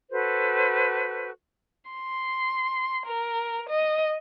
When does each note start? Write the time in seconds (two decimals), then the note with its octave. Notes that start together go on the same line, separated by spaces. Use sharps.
0.11 F#4 A4 B4 C5
1.91 C6
3.06 A#4
3.69 D#5